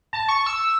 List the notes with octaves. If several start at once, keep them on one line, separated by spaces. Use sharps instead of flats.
A5
C#6
E6